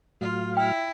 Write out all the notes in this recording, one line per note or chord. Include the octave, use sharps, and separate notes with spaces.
A2 F#3 F4 F5
E4 G5